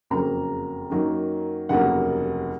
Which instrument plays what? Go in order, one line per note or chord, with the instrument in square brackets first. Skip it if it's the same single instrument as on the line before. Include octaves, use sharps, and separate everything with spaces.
[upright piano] F#1 F2 C#3 F#3 A#3 A#5
F#2 D#3 F#3 A#3
F1 D#2 C#3 F#3 A#3 F#5